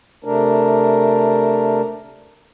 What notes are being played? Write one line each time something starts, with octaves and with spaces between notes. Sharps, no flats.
C3 A3 D4 A#4